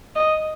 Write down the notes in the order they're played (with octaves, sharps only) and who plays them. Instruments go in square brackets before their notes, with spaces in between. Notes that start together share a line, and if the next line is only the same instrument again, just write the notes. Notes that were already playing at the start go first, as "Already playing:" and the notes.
[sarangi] D#5